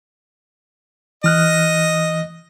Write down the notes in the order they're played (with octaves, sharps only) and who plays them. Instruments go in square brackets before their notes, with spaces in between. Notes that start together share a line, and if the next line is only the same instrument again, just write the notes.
[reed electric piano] E3 F6 F#6 [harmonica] D#5